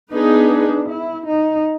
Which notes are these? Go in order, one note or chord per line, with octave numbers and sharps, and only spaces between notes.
B3 D4 D#4 G#4 B4
E4
D#4